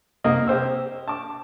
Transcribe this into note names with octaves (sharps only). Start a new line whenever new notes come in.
C2 A#3 D#5
G4 C5 E6
A5 D6